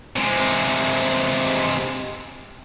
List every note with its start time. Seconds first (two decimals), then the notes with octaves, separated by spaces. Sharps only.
0.16 C3 G#3